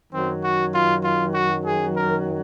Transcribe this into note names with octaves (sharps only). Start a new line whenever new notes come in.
F#2 D#3 F#3 C4
F#4
F4
F4
F#4
G#4
A#4